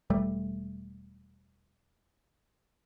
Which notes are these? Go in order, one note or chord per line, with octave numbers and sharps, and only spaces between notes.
E1 G3 A3